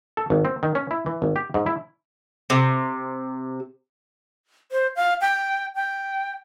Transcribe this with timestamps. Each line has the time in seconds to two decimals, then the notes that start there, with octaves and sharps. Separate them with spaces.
0.17 A4
0.30 G#1
0.45 C4
0.63 D#3
0.75 C#4
0.91 E4
1.06 E3
1.22 G#1
1.36 G4
1.54 G#2
1.66 E4
2.50 C3
4.72 C5
4.96 F5
5.21 G5
5.75 G5